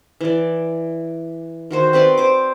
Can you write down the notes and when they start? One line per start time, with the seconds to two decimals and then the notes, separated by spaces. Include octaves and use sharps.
0.21 E3 D5
1.71 D#3 F#4 C5
1.93 C4 B4 D5 C6
2.18 C5 D6